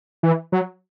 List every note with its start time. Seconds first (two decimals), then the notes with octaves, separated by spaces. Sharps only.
0.23 E3
0.52 F#3